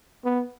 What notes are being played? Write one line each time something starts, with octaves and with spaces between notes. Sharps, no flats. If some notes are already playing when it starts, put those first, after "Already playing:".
B3